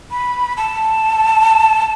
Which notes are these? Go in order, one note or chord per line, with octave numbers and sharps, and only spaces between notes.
B5
A5